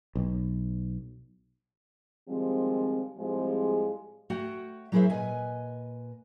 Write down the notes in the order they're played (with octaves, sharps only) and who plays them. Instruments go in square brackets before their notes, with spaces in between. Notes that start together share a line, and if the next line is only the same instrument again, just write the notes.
[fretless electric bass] B1
[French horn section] D#3 F3 G3 G#3 C4
A2 F3 G3 G#3 C4 G#4
[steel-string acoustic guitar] A3 F#4 C#5 F#5 G5
F#3 E4 G#4 A#4 C5 E5
A#2 B4 D#5 G#5